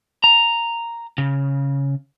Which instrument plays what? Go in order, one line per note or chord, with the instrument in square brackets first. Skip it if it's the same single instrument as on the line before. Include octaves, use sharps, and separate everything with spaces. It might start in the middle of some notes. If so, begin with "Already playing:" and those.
[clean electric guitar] A#5
C#3